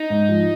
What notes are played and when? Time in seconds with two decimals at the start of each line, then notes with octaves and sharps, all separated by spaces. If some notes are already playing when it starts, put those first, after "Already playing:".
Already playing: D#4
0.10 G#2
0.29 F3